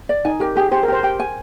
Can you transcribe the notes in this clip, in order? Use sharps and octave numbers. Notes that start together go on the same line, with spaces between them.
D5
D#4 G#5
G4 A#4
G4 G#4
G4 C5
A#4
G4 C5
G4 G5
G#5